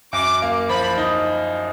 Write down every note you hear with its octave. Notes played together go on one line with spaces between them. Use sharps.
F#2 D6
A#3
F3 B5
D#4